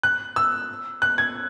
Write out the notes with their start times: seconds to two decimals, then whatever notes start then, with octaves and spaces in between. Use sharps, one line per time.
0.03 F#6
0.36 E6
1.02 F#6
1.18 G#6